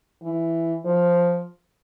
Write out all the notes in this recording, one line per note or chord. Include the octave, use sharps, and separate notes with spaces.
E3
F3